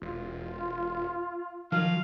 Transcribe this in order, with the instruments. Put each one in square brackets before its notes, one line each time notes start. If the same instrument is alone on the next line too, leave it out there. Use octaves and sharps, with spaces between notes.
[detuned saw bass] E1 [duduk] F4
[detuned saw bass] D#3 [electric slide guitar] F3 F#3 [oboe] F5